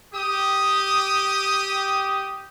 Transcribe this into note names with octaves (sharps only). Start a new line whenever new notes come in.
G4 D#6